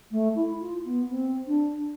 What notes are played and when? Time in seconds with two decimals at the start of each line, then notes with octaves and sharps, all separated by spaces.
0.11 A3
0.35 E4
0.59 F4
0.84 B3
1.09 C4
1.46 D4